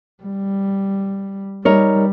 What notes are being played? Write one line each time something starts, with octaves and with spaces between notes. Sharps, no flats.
G3
G3 D#4 A#4 C#5